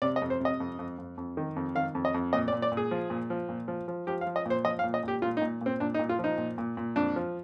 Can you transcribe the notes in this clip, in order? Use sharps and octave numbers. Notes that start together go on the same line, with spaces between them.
C3 D5
D#5
F2
C5
C3 D#5
F2
F2
F2
F2
D#3
F2
D#3 F5
F2
D#5
F2
A#2 D#5
D5
A#2
D5
A#2
G#4
F3
A#2
F3
A#2
F3
F3
F3 G4
F5
F3
D#5
A#2 C5
F3 D#5
F5
A#2
D#5
A#2 G4
A#2 F4
D#4
A#2
A#2 C4
A#2 D4
D#4
A#2
F4
F3
D#4
A#2
A#2
A#2
F2 D4
F3